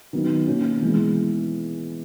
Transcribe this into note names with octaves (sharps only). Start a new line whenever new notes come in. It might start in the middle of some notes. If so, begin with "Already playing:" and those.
D#3 F#3 B3 D#4
B2 A#3 C#4
E3 G#3 B3